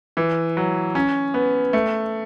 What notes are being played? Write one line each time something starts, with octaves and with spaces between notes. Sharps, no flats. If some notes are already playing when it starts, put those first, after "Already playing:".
E3
F#3
C#4
B3
A3